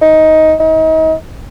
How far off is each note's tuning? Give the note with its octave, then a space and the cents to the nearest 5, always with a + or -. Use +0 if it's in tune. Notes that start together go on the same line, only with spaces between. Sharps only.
D#4 +15
D#4 +35